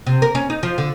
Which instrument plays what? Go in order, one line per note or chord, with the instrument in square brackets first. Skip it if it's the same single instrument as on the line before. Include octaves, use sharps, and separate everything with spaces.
[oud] C3
A#4
C#4
D#4
F3
D3